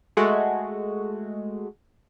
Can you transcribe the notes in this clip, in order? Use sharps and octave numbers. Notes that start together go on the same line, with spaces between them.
G#3 A3 F#4